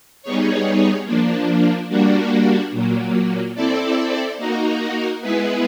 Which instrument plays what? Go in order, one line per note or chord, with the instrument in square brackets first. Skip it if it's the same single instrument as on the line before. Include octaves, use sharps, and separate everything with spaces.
[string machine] G3 B3 D#4 G#4 C#5
F3 A#3 D4
G3 A#3 D4 F#4
A#2 F#3 A#3
C4 E4 A4 D5
A#3 D#4 F#4 A#4
G#3 B3 E4 G#4 B4